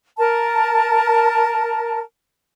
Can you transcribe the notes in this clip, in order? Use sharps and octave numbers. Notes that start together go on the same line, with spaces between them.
A#4 A5